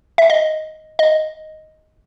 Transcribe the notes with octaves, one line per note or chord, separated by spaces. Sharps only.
E5
D#5
D#5